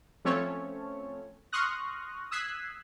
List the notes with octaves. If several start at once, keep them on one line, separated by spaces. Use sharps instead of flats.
F3 A3 C4 C#4 A4 C#5
C6 C#6 D#6 F6 F#6 A#6
D#6 E6 F#6 G#6 B6 C7